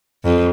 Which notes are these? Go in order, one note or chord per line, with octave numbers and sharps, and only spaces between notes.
F2